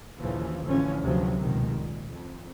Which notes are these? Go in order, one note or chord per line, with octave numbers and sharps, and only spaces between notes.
A#1 D#2 C#3 E3 F3
A1 D3 E3 F3 C#4
D2 C3 F3 F#3 B3
F1 C#2 B2 D#3
A#2
F2